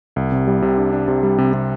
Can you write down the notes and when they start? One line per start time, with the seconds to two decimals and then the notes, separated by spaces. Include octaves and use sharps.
0.16 C2
0.32 C3
0.47 G3
0.62 C3
0.77 D4
0.93 D4
1.08 C3
1.23 G3
1.38 C3
1.54 C3